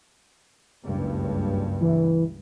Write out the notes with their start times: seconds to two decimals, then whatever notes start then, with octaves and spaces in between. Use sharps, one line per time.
0.85 F#1 C#2 G2
1.81 E3